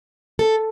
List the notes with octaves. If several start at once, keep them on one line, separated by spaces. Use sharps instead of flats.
A4